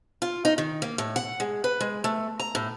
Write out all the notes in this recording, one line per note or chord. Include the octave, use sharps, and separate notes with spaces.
F4
D#4
D#3
A#3
A2
F#5
G#3
B4
G#3
A3
A#5
A2